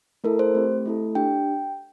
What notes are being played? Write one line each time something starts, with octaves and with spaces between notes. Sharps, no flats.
A3 E4 A4 A#4
C5
A3 C4 G4
A3 E4 A4
D4 G4 G5